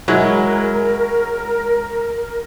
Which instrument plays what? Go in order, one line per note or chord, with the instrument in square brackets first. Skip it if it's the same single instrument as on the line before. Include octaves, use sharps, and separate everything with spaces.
[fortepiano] F#3 E4 [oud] G#3 [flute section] A#4